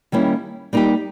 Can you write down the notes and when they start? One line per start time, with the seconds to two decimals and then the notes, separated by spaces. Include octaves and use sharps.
0.12 D#3 G3 A#3 C#4 E4
0.73 G3 A#3 D#4 G4